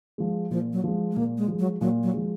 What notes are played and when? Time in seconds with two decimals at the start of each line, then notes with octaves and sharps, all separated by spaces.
0.18 F3 G#3
0.51 A#2 F3
0.73 F#3
0.84 F3 G#3
1.12 G#3
1.16 A#2 A#3
1.38 G#3
1.48 F3 G#3
1.59 F#3
1.81 A#2 F#3
2.03 F#3
2.14 F3 G#3